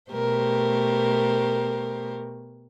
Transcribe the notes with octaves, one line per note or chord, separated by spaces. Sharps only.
B2 A3 G4 A#4 C5